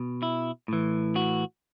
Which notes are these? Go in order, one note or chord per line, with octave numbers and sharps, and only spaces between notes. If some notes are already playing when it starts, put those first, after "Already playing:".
Already playing: B2
E4
A2 E3
F#4